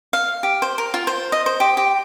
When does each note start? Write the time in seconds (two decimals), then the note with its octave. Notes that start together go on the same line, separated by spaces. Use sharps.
0.13 F5
0.43 G4
0.62 C5
0.78 A#4
0.94 F4
1.07 C5
1.32 D#5
1.46 C5
1.60 G4
1.77 G4